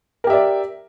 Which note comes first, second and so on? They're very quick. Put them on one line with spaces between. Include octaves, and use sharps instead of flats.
A#4 G4 E5 D5